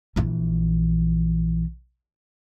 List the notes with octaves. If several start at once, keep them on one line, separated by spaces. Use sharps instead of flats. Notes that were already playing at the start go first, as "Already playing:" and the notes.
A#1 E3